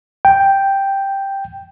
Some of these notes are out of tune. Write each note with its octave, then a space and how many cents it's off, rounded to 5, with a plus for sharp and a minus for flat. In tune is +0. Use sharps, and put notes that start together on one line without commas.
G5 +0